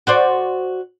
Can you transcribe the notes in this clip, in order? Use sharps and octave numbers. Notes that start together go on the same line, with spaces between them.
F#4 C5 D5